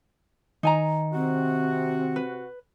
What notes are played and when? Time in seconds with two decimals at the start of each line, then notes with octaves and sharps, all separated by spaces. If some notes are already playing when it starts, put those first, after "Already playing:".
0.63 D#3 D#4 G#5 A#5
1.14 C3 C4 F#4
2.16 B4